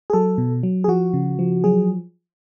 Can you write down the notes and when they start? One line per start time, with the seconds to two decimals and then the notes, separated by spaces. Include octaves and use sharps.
0.10 G#4
0.13 F#3 A4
0.38 B2
0.63 F#3
0.84 G#4
0.88 F3 F#4
1.14 C#3
1.39 F3
1.64 F#3 G#4